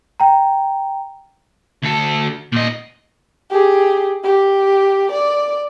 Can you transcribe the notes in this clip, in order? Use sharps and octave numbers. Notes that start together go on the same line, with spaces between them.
G5 A#5
D2 A4
A#2 D#5
G4 G#4
G4
D5